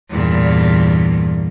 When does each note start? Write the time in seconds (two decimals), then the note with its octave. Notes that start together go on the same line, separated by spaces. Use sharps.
0.10 E2 G2 A#2